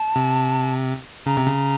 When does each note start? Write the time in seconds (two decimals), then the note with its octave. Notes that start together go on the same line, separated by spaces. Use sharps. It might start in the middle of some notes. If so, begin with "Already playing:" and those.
Already playing: A5
0.16 C3
1.26 C#3 A#5
1.37 C3
1.47 C#3